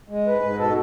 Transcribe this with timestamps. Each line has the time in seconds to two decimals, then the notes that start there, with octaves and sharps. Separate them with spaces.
0.09 G#3
0.26 G#2 B4
0.42 G#2
0.59 B2 A4